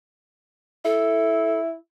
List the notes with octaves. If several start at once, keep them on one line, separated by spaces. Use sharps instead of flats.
E4 A4